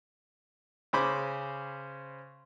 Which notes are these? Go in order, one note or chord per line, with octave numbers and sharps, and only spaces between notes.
C#3 C#4 C5 B5 D6